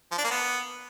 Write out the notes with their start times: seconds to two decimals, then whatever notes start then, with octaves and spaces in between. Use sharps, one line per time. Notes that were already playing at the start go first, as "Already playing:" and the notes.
0.11 F3
0.18 D4
0.24 A#3
0.31 B3